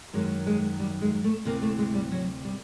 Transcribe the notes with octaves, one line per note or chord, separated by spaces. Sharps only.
F#2 D#3 F#3 G#3
G#3
G3
G#3
A3
D2 C3 E3 A#3
A3
G#3
G3
F#3
G3